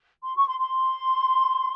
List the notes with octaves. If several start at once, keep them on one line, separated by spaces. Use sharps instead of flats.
C6
C#6
C6
C6